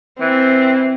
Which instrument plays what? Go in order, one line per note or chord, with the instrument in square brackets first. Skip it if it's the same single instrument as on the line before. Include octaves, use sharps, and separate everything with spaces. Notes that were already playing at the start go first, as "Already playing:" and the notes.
[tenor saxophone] E3 [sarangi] C4